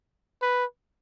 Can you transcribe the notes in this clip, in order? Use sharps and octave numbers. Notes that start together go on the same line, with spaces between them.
B4